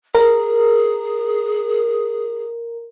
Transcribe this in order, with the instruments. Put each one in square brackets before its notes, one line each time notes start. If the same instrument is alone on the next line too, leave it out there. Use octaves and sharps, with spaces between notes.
[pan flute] G#4 [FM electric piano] A#4